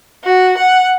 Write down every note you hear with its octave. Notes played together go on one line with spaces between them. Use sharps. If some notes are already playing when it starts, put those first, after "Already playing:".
F#4
F#5